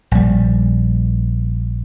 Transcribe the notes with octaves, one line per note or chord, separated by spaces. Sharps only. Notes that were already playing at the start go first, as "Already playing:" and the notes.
A#1 G3